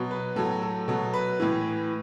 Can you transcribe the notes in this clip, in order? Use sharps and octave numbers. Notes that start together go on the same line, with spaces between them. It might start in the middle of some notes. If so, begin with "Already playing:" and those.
Already playing: B2 F#3
B4
A2 F#3 A4
A4
B2 F#3 A4
B4
A2 E3